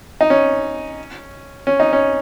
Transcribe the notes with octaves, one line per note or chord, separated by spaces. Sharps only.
D#4
C#4
C#4
D#4
C#4